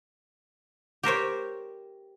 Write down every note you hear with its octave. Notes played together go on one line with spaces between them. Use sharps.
G4 A#4 C5 C#5